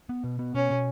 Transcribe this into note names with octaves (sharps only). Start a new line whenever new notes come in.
B3
B2
B3
B2 C#4
B2